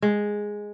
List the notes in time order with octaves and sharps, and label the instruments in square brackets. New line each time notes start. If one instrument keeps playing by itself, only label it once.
[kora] G#3